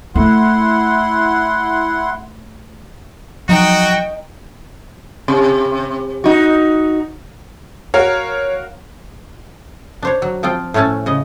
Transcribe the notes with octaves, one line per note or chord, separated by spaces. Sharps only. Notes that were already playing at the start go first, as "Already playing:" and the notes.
A3 E4 F#5 C6
F3 F#3 D#4 F#4 G5 A#5
C3
D#4 F#4
F#4 A#4 C#5 F5
D4 C5 C#5
F#3
F3 C4 F4 G5
A2 A3 C#4 G#5 A5
C#3 D#5